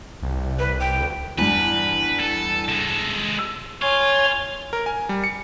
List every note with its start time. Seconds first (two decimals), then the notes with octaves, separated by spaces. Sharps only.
0.23 C2
0.59 B4
0.80 G5
1.00 D2
1.38 E2 G2 B4
2.20 A4
2.69 G#3 A4
3.39 E6
3.82 F4 C#5 G#5
4.73 A#4
4.86 G#5
5.09 G3
5.24 C#7